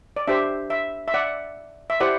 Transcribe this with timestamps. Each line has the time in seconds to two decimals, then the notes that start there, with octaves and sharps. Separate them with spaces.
0.16 D5
0.28 D4 G4 C5 E5
0.70 E5
1.08 E5
1.14 D5 F#5
1.90 E5
2.00 E4 G4 C5 D5 F#5